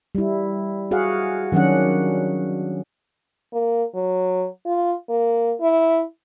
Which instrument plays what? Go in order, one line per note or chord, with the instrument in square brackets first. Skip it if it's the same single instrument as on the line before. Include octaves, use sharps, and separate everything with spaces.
[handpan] G3 E4
F#4 G#4 F5 F#5
D#3 F#3 C#4 D4 F#5
[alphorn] A#3
F#3
F4
A#3
E4